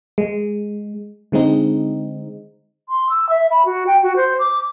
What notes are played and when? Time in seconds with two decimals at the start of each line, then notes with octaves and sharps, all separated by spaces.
0.18 G#3
1.32 D3 G#3 C4 D#4
2.89 C6
3.10 E6
3.30 E5
3.51 B5
3.65 F#4
3.87 G5
4.03 F#4
4.16 C5
4.39 D6